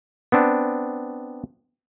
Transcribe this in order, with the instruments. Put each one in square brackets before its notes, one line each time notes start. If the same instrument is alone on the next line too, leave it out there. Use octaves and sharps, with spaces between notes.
[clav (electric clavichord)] B3 C4 D4